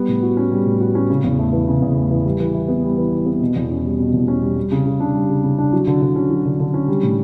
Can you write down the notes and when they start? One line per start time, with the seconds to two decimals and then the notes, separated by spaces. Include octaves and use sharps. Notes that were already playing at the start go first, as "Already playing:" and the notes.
Already playing: G3 B3
0.08 A2
0.23 F#4
0.37 C#4
0.52 G3
0.66 A2
0.81 F#4
0.95 C#4
1.10 C#3
1.24 E2
1.39 A3
1.53 E3
1.68 C#3
1.82 E2
1.96 A3
2.11 E3
2.25 G3
2.40 E3
2.54 E4
2.68 B3
2.83 G3
2.98 E3
3.12 E4
3.26 B3
3.41 B2
3.56 E2
3.70 C#4
3.85 G3
3.99 B2
4.14 E2
4.28 C#4
4.43 G3
4.57 G3
4.72 C#3
4.86 C#3
5.00 D4
5.15 G3
5.29 C#3
5.44 C#3
5.58 D4
5.73 F#3
5.87 D3
6.02 D3
6.16 C#4
6.31 F#3
6.45 D3
6.60 D3
6.74 C#4
6.88 G3
7.03 A2